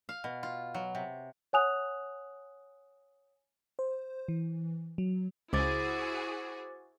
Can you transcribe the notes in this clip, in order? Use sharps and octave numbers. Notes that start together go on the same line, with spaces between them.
F5
B2
F4
F#3
C3
C#5 F#5 G#5 D#6 F#6 F7
C5
E3
F#3
C#2 E4 F#4 G#4 C5 D6 A6